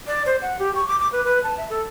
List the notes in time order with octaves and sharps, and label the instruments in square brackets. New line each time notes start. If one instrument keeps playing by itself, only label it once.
[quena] D5
C5
F#5
G4
C#6
D6
D6
B4
B4
A5
E5
A4